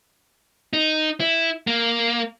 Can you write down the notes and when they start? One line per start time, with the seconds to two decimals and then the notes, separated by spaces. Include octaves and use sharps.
0.73 D#4
1.20 E4
1.67 A#3